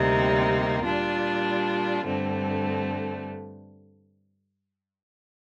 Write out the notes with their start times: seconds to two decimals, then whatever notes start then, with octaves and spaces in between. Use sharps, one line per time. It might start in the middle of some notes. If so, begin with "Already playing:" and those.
Already playing: D2 C3 G3 A#3 D#4
0.83 A#2 G3 D4 F4
2.05 G2 D3 A3 C4